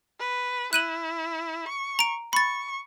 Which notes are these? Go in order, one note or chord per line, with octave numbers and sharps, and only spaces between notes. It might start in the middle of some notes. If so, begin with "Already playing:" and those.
B4
E4 F#6 D#7 F#7
C#6
A#5 D7
B5 C#6 A6